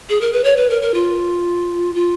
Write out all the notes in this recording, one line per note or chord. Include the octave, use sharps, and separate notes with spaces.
G#4
A#4
B4
C#5
B4
A#4
A#4
F4
F4